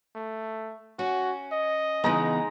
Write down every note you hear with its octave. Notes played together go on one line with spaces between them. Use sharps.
A3
C#4 F#4
D#5
C#3 E3 G#3 B3 D#4 A#5